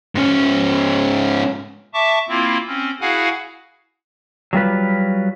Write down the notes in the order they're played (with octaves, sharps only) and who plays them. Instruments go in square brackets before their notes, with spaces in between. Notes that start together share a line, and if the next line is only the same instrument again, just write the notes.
[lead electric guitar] G#2 C#4
[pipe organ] E5 A5 C#6 D6
A#3 C4 E4 F4
C4 C#4
E4 F#4 G#4 F5 F#5 G#5
[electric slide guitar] F#3 G3 F4 B4